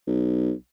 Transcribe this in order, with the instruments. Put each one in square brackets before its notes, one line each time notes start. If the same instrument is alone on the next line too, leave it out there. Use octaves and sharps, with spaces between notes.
[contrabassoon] B1